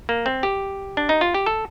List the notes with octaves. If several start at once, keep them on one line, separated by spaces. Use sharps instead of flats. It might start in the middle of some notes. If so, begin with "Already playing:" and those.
A#3
C4
G4
D4
D#4
F4
G4
A4